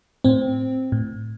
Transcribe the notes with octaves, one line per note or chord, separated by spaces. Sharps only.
A2 C4
A2